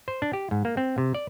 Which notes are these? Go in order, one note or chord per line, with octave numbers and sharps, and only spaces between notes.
C5
D4
G4
G#2
A#3
C4
C3
D5